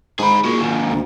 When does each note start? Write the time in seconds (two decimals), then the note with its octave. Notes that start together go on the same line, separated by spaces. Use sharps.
0.19 G#2 G#4 B5
0.45 A#2 F#4 G#4
0.61 D#2 G#2
0.90 D2